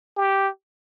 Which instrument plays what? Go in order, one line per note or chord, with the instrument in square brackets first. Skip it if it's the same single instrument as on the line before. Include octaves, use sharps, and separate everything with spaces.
[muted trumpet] G4